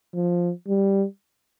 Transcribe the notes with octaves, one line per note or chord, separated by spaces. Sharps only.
F3
G3